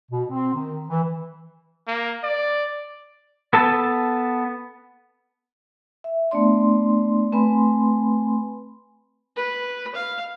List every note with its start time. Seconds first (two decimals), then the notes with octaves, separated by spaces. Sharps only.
0.11 B2
0.29 C4
0.54 D#3
0.89 E3
1.88 A#3
2.23 D5
3.53 B3 A4 A5
6.04 E5
6.31 A3 B3 D4 D5 C6
7.32 A3 C4 B4 G#5 B5 C6
9.36 B4
9.95 F5